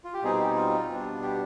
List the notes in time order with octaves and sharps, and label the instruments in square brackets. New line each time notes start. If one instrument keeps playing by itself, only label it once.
[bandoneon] F4
G4
B2 G3 C4 D#4 G#4
G#4
G4
F4
B2 G3 B3 D4
G4